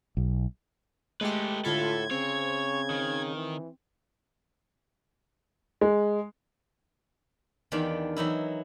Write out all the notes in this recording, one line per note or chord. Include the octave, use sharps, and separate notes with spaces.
B1
G#3 A3 G4 A4 B4
A2 D3 F4 A4 B5 G#6
C#3 C4 C#5
D#3
E3
G#3
E2 D#3 D4 G4 F5 G5
E3 F#3 D#4 E4